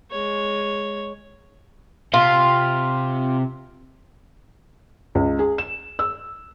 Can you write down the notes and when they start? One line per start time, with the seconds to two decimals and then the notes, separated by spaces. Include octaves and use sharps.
0.11 G#3 C#5
2.14 C3 F4
5.15 C#2
5.39 G#4
5.58 E7
5.99 E6